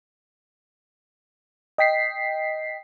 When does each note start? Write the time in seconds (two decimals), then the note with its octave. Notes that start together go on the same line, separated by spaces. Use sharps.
1.78 D#5 G5 B6 C7